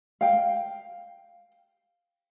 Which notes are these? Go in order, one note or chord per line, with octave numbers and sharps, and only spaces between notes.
F5 G5